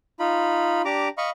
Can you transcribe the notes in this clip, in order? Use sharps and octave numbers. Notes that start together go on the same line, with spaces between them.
D#4 F4 B5
D4 G4 A#5 D6
D#5 F5 B5 C#6